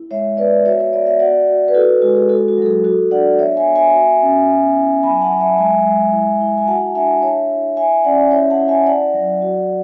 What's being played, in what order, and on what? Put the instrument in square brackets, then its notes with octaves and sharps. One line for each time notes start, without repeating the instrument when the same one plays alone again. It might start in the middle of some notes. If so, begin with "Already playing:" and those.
Already playing: [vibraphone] E4
G#3 C#5 E5
B3 B4 D5
F#4 C#5 E5
C#5
B3 D5
E5
F#4 D5 F#5
F#4
B4
E4 F#4 A4
F#4
G#3 F#4
G#4
F#4 A4
F#4
F#3 A4
G#4
F#4 A4
D4 D5 F#5
B3 C#5 E5
E5 G#5
B3
E5 G#5
F#4
C#4
B3
E4
F#3 G#5 B5
F#5 A5
F#3
E5 G#5
G#3 E5 G#5
G#3
E4
E4
G#5
F#4 F#5 A5
D4 E5 G#5
E4 C#5 E5
E4
E4 E5 G#5
C#4 D5 F#5
E4 C#5 E5
F#5 A5
E4
E5 G#5
E4 D5 F#5
F#3
F#4